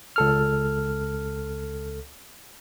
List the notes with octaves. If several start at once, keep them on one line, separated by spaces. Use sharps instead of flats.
C#2 A4 F6